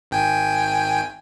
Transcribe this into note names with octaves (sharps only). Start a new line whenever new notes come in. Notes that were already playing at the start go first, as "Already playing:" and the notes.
G#1 G5 G#5